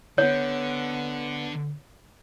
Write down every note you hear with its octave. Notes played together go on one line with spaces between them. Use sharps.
D3 B3 C#5